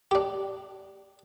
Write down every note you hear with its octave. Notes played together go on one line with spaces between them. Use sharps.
D4 G4